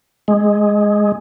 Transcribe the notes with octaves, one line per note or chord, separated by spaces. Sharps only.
G#3